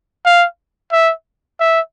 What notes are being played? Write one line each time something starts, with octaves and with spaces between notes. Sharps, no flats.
F5
E5
E5